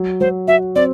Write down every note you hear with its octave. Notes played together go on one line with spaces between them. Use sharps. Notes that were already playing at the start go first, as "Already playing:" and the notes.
Already playing: F#3
F#3 C5
F#4 E5
C4 D5